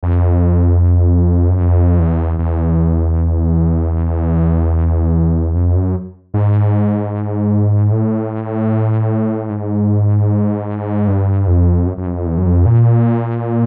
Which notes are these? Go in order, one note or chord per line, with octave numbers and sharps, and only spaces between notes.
F2
F#2
F2
E2
E2
F2
F#2
G#2
A2
G#2
G2
F2
F#2
F#2
F2
E2
F#2
F2
A#2